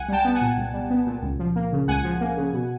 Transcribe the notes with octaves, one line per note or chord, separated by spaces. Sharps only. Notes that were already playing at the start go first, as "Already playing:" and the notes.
Already playing: C2 F#5 G#5
G3 G5 A5
B3
F#5 G#5
A#2
C2
G3
B3
A#2
C#2
F3
A#3
C#3
C#2 F#5 G#5
F3
A#3
C#3
B2